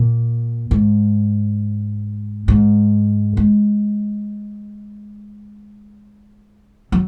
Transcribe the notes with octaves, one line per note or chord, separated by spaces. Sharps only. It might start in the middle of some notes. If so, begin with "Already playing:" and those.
Already playing: A#2
G#2
G#2
G#3
F#3